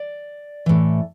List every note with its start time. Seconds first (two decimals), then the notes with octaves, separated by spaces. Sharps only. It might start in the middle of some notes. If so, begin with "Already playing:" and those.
Already playing: D5
0.66 A2 E3